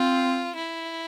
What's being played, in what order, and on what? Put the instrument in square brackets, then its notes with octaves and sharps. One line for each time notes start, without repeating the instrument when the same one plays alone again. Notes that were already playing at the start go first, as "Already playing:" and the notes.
Already playing: [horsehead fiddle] C4 [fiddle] F4
[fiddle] E4